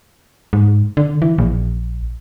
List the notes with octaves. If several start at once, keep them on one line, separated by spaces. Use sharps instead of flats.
G#2
D3
E3
A#1